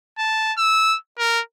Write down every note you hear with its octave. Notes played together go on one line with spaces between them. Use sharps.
A5
E6
A#4